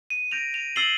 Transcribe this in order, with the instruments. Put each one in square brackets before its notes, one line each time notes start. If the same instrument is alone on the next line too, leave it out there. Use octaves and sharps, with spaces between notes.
[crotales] D#7
[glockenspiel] G6 A#6 D7 [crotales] F7
[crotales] F7
[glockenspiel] E6 A6 C7 E7 G7 [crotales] F#7